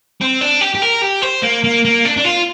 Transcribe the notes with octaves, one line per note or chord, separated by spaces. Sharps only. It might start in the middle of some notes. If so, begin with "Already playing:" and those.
C4
D4
G4
G4
A#4
G4
C5
A#3
A#3
A#3
D4
D4
F4